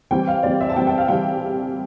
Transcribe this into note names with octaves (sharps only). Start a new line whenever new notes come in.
E3 G3 C4 G5
F5
E3 G3 C4 D5
E5
A5
E3 G3 C4 G5
G5
F5
E3 G3 C4 G5